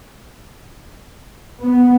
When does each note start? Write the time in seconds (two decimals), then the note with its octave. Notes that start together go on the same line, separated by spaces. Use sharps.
1.62 B3